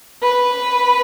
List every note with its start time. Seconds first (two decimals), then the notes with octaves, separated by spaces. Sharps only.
0.23 B4